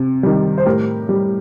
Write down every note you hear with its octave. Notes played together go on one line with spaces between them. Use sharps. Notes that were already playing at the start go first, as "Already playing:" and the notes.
Already playing: C3
D#3 G3
C5
A2 G4 A#4
G3